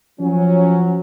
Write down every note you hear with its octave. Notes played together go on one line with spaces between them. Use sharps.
F3 F#3 C#4